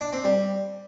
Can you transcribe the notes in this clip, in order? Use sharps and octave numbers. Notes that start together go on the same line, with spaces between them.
D4
C4
G3